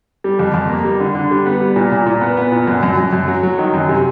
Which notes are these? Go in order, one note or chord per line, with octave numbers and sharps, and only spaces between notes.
G3
F2
F2
A#3
G3
D3
D3
G3
B3
G3
A#2
A#2
A#2
B3
B3
A#2
F#2
F#2
F#2
F#2
F#3
F#3
D#3
F#2
C3